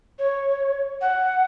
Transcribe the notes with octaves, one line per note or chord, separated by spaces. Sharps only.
C#5
F#5